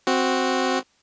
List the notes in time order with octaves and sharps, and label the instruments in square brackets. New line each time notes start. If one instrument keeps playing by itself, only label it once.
[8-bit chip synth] C4 F#4